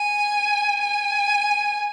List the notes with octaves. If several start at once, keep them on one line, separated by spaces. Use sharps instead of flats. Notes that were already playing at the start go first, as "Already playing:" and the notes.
Already playing: G#5
G#5